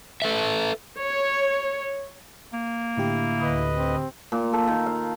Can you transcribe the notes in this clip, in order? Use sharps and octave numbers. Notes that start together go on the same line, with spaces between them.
A4 B4 E5
C#5
A#3
A2 D3 E4 G4
D2 B4 D#5
C4
A#2
A4
D#3
F5